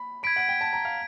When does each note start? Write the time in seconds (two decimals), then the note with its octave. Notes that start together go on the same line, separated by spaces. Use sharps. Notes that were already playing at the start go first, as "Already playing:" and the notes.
Already playing: B5
0.23 B5 G#6 B6 D7
0.36 F#5
0.49 G5
0.61 A5
0.73 A#5
0.85 F5